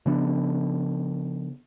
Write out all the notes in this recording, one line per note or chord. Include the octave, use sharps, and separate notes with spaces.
C#3 F3 B3 D4